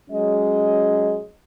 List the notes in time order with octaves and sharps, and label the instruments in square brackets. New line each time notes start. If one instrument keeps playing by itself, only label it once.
[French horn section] F#3 G#3 C#4 D#5